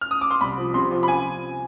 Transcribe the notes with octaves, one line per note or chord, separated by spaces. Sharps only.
F6
D#6
D6
C6
C2 B5
F3
C3 C6
F3
B5
F3 G#5